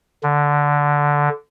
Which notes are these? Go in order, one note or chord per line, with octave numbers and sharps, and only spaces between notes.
D3